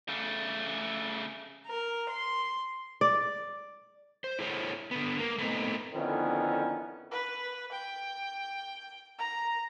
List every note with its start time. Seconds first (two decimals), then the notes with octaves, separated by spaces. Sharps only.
0.08 C#3 A3
1.66 A#4
2.08 C6
3.01 D5
4.24 C5
4.39 E4 G#4 A4 C5 C#5
4.91 D3 B3
5.19 A#3
5.38 A3 B3 C4 D#4
5.94 F2 D3 D#3 B3 C#4 E4
7.11 B4
7.71 G5
9.18 A#5